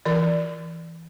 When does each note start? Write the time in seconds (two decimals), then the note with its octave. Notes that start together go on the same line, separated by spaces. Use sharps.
0.05 E3 D5